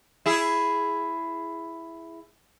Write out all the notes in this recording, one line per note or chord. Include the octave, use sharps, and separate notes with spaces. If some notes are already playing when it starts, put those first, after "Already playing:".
E4 G#4